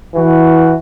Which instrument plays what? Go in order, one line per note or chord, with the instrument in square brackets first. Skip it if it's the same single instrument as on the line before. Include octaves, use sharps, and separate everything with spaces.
[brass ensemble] E3 F#4